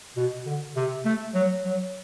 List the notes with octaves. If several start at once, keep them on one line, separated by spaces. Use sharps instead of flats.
B2
D3
C3
A3
F#3
F#3